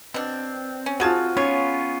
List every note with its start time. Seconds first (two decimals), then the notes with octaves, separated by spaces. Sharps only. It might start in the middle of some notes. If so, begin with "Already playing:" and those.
0.14 B2 C4 D4
0.86 C#4
1.00 F3 F4 F#4 G#4 A5
1.37 B3 C#4 F4 G#4 C#5